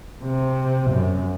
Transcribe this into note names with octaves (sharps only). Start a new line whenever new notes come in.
C3
F#2